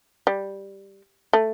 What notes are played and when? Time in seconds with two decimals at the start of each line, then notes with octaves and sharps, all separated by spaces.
0.27 G3
1.33 A3